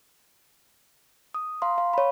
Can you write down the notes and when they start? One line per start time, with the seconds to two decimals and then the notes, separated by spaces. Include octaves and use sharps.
1.34 D#6
1.62 F5 A#5 C6
1.78 F5
1.93 C#5 B5